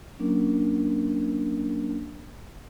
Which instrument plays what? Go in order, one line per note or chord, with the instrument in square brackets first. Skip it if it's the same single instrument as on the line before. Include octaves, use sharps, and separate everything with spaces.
[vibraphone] F#3 A#3 C#4 D4 A#4